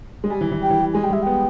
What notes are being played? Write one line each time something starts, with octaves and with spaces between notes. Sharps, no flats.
G#3
G3 G#5
E3
E3
G3 G5
E3
G3
G#3 G#5
G3 G5
G#3 E5
B3 G5